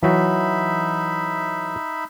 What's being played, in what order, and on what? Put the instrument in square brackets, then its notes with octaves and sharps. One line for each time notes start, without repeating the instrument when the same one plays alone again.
[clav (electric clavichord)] E3 F#3 F#4 [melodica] D#4 E5 B5